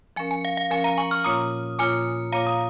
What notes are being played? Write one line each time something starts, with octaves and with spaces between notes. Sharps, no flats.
F3 C#4 A#4 G#5
G#5
F5
F5
F3 C#4 A#4 G#5
F5 A#5
G#5 C#6
C#6 F6
A#2 A#3 F4 C#5 A#5 D#6
A#2 A#3 F4 C#5 G#5
A#2 A#3 F4 C#5 F5 A#5
A#5 D#6